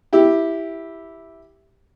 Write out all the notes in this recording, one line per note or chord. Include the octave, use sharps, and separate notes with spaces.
E4 G4